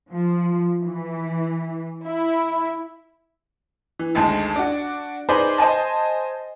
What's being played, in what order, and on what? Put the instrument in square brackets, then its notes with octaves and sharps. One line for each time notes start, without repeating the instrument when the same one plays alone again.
[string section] F3
E3
E4
[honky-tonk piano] E3
G#1 D2 G#3 A5
D4 F#4
D#4 G#4 B4 C5 D5
C5 D#5 G#5 A5